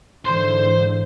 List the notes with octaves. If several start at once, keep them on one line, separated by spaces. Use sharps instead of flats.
G#2 D3 E3 C5 C6